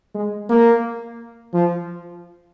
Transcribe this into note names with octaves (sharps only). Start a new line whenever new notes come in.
G#3
A#3
F3